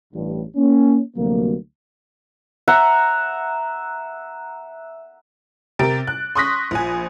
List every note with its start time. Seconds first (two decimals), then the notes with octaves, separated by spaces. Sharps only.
0.13 A1 G2
0.56 A#3 C#4
1.16 D2 C3 F#3 G3 A#3
2.68 E5 F#5 A#5
5.79 C3 G4 A#4 A6 D7
6.07 F#6
6.35 C6 C#6 D#6 F#6 A#6 B6
6.71 A#1 F3 G#5